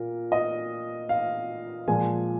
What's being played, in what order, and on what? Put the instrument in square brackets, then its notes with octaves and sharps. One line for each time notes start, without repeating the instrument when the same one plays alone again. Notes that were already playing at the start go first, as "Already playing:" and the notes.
Already playing: [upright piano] A#2 A#4
D#5
F5
A#2 F3 G#3 G#5